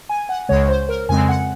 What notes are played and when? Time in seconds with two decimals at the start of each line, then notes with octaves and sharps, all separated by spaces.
0.09 G#5
0.29 F#5
0.49 C#2 C#3 G#3 C#5
0.68 C5
0.89 A#4
1.09 F2 C#3 G#3 C4 G#5
1.29 F#5